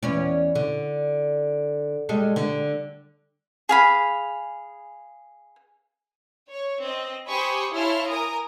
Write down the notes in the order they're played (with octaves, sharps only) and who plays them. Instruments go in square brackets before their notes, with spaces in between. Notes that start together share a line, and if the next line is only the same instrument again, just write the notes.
[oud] E2 C#4 D5
D3
G3 G#3 A4
D3
[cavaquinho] G#4 F5 B5
[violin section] C#5
C4 D#5
G4 C5 G#5 B5 C#6 D#6
E4 C#5 F5 A5 C6 F6
A#4 G#5 A#5 D#6